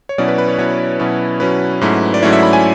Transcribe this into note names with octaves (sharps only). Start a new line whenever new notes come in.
C#5
B2 F#3 C#4 E4 D5
B4
B4
C#5
B2 F#3 C#4 E4 C#5
B2 F#3 C#4 E4
B2 F#3 C#4 E4 B4
G#2 F#3 A3 C#4 E4
D5
G#2 F#3 A3 C#4 E4 C#5
E5
B5
G#5